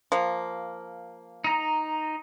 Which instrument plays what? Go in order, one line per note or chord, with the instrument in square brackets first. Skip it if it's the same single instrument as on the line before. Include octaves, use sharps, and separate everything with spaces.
[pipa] F3 A#3
[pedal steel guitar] D#4 A#5